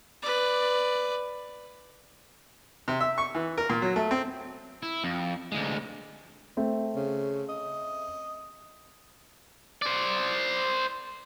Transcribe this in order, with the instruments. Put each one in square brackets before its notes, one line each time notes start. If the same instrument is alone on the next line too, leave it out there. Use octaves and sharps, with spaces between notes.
[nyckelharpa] B4 D5
[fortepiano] C3
E5
C#6
E3
A#4
A#2
F#3
A3
C4
[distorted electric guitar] E4
F2
D2 G#3
[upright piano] A3 C4
[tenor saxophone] C#3
D#5
[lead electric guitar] C5 D5